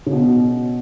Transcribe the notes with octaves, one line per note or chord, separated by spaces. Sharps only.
C#3
B2